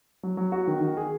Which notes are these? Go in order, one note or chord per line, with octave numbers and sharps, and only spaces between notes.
F#3
F#3
F#4
D#3
D#3
G#4